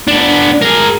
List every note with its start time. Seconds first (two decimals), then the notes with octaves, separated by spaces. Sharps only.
0.08 B3 D4
0.62 G#4 A#4